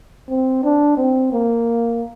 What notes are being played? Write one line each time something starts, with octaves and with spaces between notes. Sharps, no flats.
C4
D4
C4
A#3